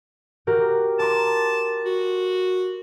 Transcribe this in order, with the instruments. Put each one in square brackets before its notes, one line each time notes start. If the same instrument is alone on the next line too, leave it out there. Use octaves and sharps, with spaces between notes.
[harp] F#4 G4 A#4
[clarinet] A5 [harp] A#5 C6 D6
[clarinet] F#4